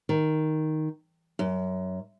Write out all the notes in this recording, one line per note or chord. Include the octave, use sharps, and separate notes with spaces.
D#3
F#2